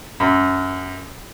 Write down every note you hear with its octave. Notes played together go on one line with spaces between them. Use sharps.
F#2